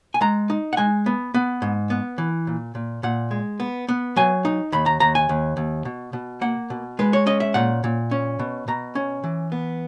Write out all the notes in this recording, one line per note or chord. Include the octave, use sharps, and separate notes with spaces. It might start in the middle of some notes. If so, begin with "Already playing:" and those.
G#5
G#3 A#5
D#4
F#5
G#3 G#5
B3
B3
G#2
B3
E3
A#2
A#2
A#2 F#5
G#3
B3
B3
F#3 G#5
D#4
D#2 B5
A#5
D#2 A#5
G#5
D#2
D#2
B2
B2
A#3 F#5
B2
G#3 B4
C#5
C#4 D#5
E5
A#2 F#5
A#2
C#4
B2
B2 A#5
C#4
E3
B3